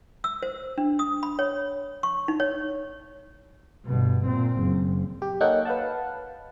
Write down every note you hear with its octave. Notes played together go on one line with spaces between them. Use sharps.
E6
C5
D4
D#6
B5
C#5
C#6
D#4
C#5
G1 B2
A#2 C4
F#1
G4
A#3 D#4 A4 C#5 F#5 G5
B4 F5 F#5 A5